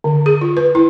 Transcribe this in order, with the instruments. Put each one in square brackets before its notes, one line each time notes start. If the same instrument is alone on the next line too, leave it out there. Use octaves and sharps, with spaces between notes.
[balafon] D3
G#4
F4
B4
E4